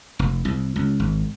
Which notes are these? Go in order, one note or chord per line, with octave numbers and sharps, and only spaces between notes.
F1
C2
C#2
G#1